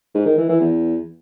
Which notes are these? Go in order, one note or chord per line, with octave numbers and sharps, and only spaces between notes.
G#2
D#3
E3
E3
E2